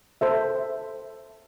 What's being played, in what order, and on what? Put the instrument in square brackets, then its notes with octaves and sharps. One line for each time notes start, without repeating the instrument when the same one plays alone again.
[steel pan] A4 C5 E5